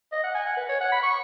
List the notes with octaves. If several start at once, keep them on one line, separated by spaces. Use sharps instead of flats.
D#5
F#5
G#5
F#5
B4
C#5
F#5
B5
C#6